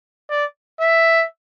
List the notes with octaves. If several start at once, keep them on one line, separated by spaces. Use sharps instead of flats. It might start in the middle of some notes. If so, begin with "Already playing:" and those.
D5
E5